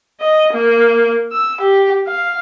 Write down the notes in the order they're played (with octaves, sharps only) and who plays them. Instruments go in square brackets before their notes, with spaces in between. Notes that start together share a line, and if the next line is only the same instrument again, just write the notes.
[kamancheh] D#5
A#3
E6
G4
F5